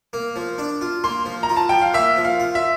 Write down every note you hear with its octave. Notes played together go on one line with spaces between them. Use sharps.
A#3
F3
D4
F4
A#3 C6
F3
A#5
F4
A5
F3 G5
F5
A#3 E5
F3
F5
F4
E5